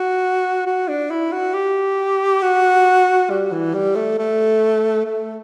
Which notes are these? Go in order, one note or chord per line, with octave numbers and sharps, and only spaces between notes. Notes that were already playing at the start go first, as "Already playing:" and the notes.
Already playing: F#4
F#4
D4
E4
F#4
G4
F#4
G3
E3
G3
A3
A3
A3